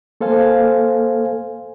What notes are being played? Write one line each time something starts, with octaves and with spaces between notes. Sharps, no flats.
A#3 A4 C5 F5 G#5